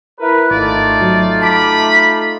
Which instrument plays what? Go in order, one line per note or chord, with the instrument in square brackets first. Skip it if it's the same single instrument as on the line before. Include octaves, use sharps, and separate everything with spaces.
[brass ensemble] E4 A#4 B4
[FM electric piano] G#1 [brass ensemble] A3 D#4 F4 [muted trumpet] D5
[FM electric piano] G#1 F#3
[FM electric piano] A5 D6 [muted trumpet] B5